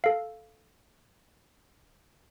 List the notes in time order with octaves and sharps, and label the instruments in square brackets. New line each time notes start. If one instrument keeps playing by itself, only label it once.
[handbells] A4 F5